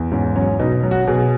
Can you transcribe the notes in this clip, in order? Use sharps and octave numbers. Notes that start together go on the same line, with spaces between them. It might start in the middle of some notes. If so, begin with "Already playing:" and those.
Already playing: E2
G#2 C#4
F#3 C#4
B2 D#4
F#3
F#4
B2 G#4